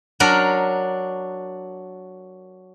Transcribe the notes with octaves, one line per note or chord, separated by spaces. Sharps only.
F#3 D4 A#4